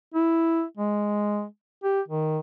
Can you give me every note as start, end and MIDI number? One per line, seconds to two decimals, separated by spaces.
0.14 0.63 64
0.77 1.44 56
1.84 2.01 67
2.08 2.39 51